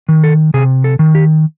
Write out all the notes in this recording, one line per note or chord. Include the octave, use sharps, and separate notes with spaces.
D#3
A4
C3 G#4
A4
D#3
G4